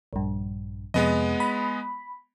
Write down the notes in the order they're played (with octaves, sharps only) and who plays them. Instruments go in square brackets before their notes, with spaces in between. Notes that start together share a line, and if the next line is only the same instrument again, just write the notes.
[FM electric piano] A#1 G2
[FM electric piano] F2 C3 [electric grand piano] G#3 B3 D#5
[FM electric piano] B5